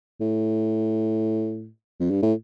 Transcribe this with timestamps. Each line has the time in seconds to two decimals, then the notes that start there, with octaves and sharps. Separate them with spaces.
0.20 A2
2.00 F2
2.11 G2
2.22 A2